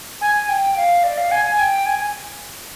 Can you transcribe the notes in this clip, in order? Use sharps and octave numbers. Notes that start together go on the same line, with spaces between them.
G#5
G5
F5
D5
F5
G#5
G#5
G5
G#5